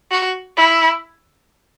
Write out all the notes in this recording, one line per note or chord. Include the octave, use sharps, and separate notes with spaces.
F#4
E4